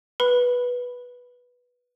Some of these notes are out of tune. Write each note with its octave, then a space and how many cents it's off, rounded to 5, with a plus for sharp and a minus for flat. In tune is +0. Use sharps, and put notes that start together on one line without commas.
B4 -10 B5 +0